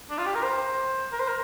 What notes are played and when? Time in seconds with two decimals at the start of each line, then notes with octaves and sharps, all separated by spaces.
0.10 D4
0.18 F4
0.26 G4
0.35 A#4
0.43 C5
1.12 A#4
1.20 C5
1.29 A#4